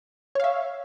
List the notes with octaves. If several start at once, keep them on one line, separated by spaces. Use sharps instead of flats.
C#5 E5 F5